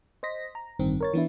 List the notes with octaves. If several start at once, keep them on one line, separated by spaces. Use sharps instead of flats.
C5 D#5 A#6 B6
A#5
A1 G2 D#3 C4
A#4 C#5 A6
E3 B3 D4 E4